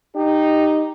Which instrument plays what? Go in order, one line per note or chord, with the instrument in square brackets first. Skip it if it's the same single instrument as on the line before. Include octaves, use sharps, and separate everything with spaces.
[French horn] D#4 [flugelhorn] G4